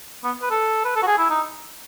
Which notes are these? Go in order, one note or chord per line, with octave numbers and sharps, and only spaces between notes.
B3
B4
A4
B4
A4
F#4
G#4
E4
D#4